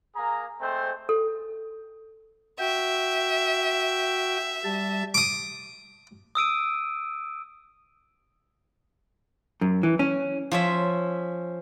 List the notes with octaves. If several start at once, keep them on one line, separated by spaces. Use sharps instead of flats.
A#3 G#4 A#5
G#3 A3 C4 C5
A4
F#4 E5 G5
G3 A5
D6 D#6
D#6 E6 D7 D#7
F#2
E3
C#4
F3 C#4 E5